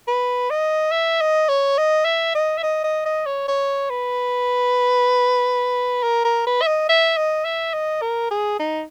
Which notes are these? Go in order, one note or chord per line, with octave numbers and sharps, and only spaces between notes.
B4
D#5
E5
D#5
C#5
D#5
E5
D#5
E5
D#5
D#5
D#5
C#5
C#5
B4
A#4
A#4
B4
E5
D#5
E5
D#5
E5
D#5
A#4
G#4
D#4